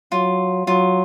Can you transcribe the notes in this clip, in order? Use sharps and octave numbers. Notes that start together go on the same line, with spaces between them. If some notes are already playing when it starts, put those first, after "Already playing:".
F#3 F4
F#3 F4